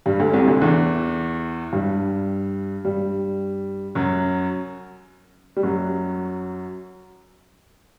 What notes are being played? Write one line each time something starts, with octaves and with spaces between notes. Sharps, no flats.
G2 G3
D2 D3
C2 C3
D2 D3
E2 E3
G2 G3
G2 G3
F#2 F#3
G3
F#2 F#3